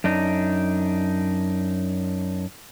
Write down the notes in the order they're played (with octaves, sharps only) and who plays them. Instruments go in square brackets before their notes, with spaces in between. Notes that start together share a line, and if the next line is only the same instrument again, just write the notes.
[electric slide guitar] F#2 D4 D#4